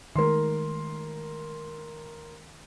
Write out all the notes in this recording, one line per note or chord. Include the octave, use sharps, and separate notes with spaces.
D#3 G#3 A3 A#4 C6